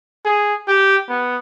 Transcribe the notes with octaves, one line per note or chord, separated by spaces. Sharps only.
G#4
G4
B3